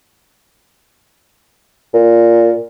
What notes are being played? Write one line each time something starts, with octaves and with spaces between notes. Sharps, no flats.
A#2